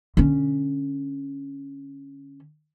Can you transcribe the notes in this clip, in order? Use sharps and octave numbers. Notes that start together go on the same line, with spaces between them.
D3 C#4